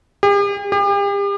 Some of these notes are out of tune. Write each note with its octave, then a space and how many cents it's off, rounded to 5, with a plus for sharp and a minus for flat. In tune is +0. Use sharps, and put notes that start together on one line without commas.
G4 +45
G4 +40